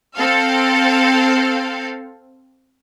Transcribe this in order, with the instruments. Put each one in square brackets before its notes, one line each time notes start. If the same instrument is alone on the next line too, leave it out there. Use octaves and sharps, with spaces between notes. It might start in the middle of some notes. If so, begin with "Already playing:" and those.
[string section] C4 A4 F5